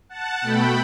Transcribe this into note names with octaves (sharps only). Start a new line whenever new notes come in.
F#5 A5
B2 A3 G5 B5